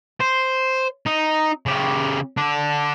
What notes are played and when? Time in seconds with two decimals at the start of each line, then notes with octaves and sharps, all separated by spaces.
0.21 C5
1.07 D#4
1.66 C#3 G4
2.37 D3 D4